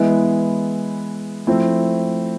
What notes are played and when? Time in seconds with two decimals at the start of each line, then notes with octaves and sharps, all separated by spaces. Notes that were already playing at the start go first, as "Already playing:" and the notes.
Already playing: E3 G#3 B3 E4
1.47 F3 A3 C4 E4